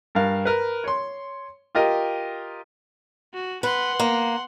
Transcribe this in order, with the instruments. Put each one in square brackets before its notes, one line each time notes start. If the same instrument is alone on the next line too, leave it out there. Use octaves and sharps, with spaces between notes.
[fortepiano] G2 A#4 F5
A#4 B4
C#5 C6
F4 G4 A#4 D#5
[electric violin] F#4
[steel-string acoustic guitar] B4 [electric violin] F#5 C6
[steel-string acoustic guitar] A#3